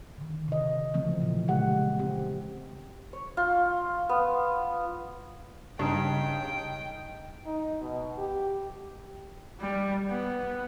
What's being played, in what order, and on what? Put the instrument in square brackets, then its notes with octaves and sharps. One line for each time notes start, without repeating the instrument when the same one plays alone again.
[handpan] D3 D#3
C3 D#5
C#3 E3 F3 A3 C4
A#2 C#3
A#2 C#3 G#3 G4 F#5
C4 G4
[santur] C#5
F4
B3
[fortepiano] G2 [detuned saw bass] C#3 [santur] D#4 A5 [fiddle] G5
[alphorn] D#4
B2
G4
[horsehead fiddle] G3
B3